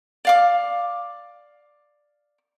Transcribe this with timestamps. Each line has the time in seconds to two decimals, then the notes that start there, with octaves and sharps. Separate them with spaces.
0.25 D5 F5 D6